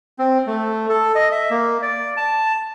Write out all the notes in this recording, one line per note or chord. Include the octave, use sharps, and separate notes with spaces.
C4
A3
A4
D#5
E5
A#3
D5
A5